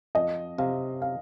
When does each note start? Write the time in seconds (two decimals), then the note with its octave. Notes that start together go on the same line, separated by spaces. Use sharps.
0.15 F2 D#5
0.58 C3 F5
1.02 F5